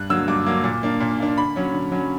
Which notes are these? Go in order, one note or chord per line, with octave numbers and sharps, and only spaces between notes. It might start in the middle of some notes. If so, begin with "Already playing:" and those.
Already playing: G2 F#6
D3 F#3 A#3 E6
G2 D6
D3 F#3 A#3
A#2
A#3 D4
A#2
A#3 D4
D3 B5
F#3 C#4
D3
F#3 C#4